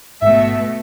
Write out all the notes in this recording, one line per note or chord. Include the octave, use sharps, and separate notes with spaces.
A1 G#2 B2 A3 E5